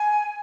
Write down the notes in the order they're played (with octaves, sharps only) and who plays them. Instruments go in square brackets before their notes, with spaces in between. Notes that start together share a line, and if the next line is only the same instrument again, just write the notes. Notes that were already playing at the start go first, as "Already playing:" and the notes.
Already playing: [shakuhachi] G#5